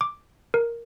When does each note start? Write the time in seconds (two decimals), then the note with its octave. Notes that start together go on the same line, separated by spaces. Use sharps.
0.01 D6
0.54 A#4